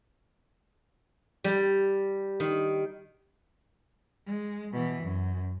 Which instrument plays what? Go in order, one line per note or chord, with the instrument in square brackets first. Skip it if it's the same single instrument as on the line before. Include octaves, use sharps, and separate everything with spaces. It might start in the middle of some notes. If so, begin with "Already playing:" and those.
[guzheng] G3
D#3
[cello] G#3
B2 E3
F#2